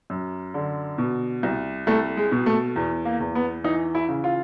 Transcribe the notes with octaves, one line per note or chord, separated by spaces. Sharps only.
F#2
D3
B2
C2
C2 A3
G#3
B2
A3
E2
A#3
E2
B3
E3 D#4
E4
C#3
F4